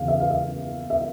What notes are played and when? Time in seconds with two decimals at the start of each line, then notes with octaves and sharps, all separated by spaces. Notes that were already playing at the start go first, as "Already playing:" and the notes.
Already playing: E2 C#3 F5
0.08 E5
0.20 F5
0.30 E5
0.90 E5